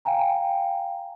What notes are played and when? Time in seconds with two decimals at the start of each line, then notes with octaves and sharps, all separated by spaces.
0.05 F5 G5 G#5 A#5